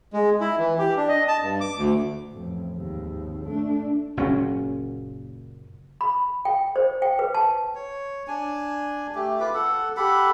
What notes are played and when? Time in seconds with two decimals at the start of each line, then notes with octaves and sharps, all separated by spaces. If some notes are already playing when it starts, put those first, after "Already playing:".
0.13 G#3
0.41 E4
0.59 E3
0.79 G4
0.97 D4
1.09 D#5
1.28 A5
1.42 G2
1.60 D6
1.77 D2
2.31 A1 F2
2.73 G#1 D#2
3.46 A3 D4
4.17 F#1 A#2 C#4
6.01 B5
6.45 G5
6.76 C5
7.02 G5
7.19 B4
7.35 A5
7.75 C#5
8.28 D4 G#5
9.15 A3 G4
9.40 F4 B4 D6
9.54 A4 F#5
9.97 G4 A4 F#5 B5